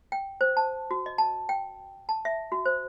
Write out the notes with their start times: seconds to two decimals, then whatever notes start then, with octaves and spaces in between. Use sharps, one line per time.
0.12 G5
0.41 C5
0.57 A5
0.91 F#4
1.06 D#5
1.18 A5
1.49 G5
2.09 A5
2.25 E5
2.52 F#4
2.66 C5